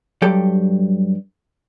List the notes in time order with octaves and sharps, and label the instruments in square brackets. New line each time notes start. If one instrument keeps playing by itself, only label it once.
[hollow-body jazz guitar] G2 F#3 G4 A4 G5